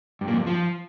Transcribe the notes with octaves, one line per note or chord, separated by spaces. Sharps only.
G2
A#2
F2
G2
F3